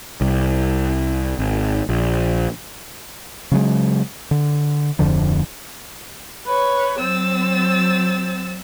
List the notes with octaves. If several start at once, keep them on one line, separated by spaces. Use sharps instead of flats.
C2
G#1
A#1
C#3 F#3 G#3
D3
D1 F2 D3 F3
B4 C#5
F#3 C4 E6 A6